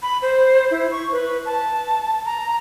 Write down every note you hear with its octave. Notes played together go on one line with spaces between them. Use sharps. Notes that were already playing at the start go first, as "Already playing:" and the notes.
B5
C5
E4
C#6
B4
A5
A#5